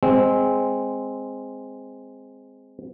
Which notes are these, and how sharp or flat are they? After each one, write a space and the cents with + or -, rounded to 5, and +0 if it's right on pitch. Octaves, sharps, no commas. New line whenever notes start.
G#3 -5 C4 -5